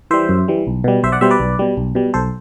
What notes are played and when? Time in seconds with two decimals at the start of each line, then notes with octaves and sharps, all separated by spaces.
0.11 E3 G3 C5 E5
0.29 F#2
0.48 E3 G3
0.67 B1
0.84 B2 G3
1.03 B1 C5 E5
1.12 D5 F#5
1.21 B2 G3 C5 E5
1.31 B4 D5
1.40 B1
1.59 B2 G3
1.77 B1
1.95 B2 G3
2.14 B1 A4 C5